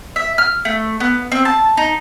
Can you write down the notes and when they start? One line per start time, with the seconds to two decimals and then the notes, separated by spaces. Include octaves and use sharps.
0.16 E5
0.38 F6
0.65 A3
1.00 B3
1.32 C4
1.45 A5
1.77 D#4